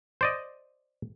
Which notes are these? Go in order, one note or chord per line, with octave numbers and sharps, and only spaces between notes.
C5 D5 D#5